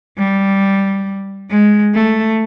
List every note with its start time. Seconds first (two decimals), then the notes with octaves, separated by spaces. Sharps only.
0.18 G3
1.50 G#3
1.95 A3